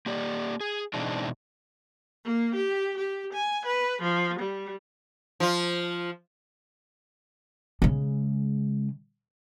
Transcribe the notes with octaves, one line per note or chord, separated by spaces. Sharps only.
A#3 G4 D5
G#4
B2 E3 G#3 C4 D4 D#4
A#3
G4
G4
G#5
B4
F3
G3
F3 F4
C#3 G#3